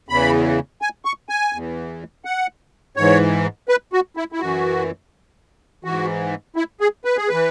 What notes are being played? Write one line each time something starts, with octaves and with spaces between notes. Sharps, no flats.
E2 C#3 E3 B5
G#5
C#6
G#5
E2
E3
F#5
G#2 E3 C#5
B4
F#4
E4
E4
F#2 E3 F#4
G#2 E3 F#4
E4
G#4
B4
G#4
E3 B4